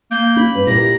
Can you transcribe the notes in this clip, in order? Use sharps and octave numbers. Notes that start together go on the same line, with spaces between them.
A#3 G6
C#4 B5
G2 A#3 B4
A#2 E4 G4 A#4 A#6